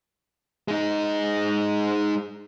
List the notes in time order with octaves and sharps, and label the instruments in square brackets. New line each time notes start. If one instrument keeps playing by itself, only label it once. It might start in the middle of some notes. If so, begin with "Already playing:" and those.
[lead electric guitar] G#3 D#4